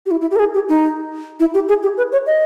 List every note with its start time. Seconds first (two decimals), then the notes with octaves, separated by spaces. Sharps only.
0.06 G4
0.11 E4
0.21 E4
0.31 G4
0.36 A#4
0.39 G#4
0.54 G4
0.69 D#4
1.40 E4
1.54 G4
1.69 G#4
1.83 G4
1.97 B4
2.12 C#5
2.26 D#5